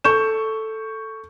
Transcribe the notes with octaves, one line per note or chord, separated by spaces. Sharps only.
A4 C#6 G6 E7